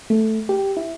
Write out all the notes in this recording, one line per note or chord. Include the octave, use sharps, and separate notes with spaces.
A3
G4
E4